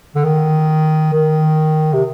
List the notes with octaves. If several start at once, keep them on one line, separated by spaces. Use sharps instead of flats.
D3
D#3
D#3
C3